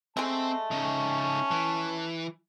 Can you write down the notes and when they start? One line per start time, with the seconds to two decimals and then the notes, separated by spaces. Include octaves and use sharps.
0.17 G#3 A3 C4 A5
0.71 C#3 C#4 D#4
1.51 E3